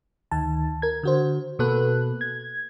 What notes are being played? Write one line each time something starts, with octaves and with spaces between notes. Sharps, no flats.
D2 D#3 A5
A#4 G#6
D3 F#4 C5
B2 A#3 F#4 A4 B4 F#6
G#6